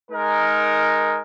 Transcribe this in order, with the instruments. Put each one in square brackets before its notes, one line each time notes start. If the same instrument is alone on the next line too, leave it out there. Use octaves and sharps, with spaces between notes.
[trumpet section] G#3 D#4 A#4